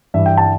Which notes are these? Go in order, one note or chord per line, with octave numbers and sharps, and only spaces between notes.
G2 E3 E5
G5
A5